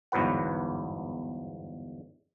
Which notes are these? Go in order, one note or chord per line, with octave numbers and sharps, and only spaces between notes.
G1 E2 G#2 F#3 B4 F#5